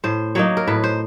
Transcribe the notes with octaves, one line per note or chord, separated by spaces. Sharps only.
A2 C5
F#3 A#3 D#4 C#5
A#4
A2 B4
C5